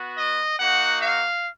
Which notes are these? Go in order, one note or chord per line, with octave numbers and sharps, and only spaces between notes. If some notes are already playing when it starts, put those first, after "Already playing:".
Already playing: B3 F#4
D#5
A#3 D#4 F#4 F#5
F5